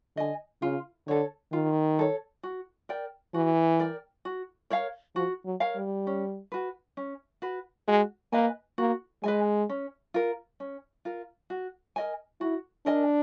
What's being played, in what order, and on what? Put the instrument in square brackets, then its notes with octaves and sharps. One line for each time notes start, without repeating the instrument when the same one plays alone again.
[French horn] D3 [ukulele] D#5 G#5
[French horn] C#3 [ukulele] F4
[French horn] D3 [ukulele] A4 C#5
[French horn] D#3 [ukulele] F4
[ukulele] A4 C#5
F#4
A#4 D5 G5
[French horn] E3 [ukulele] F#4
[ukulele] A#4 D5 G5
F#4
A#4 C#5 F5
[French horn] F3 [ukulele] F#4
[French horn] F#3
[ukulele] A#4 C#5 F5
[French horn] G3
[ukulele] C#4
F#4 B4
C#4
F#4 B4
[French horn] G#3 [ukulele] F#4
[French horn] A#3 [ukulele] B4 D#5 G#5
[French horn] A#3 [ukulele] F#4
[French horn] G#3 [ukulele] B4 D#5 G#5
[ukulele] C#4
F4 A#4
C#4
F4 A#4
F#4
A#4 D#5 G#5
[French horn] E4 [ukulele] F#4
[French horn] D4 [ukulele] A#4 D#5 G#5